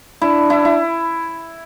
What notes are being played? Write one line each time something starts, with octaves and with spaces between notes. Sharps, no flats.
D4 E4
E4
E4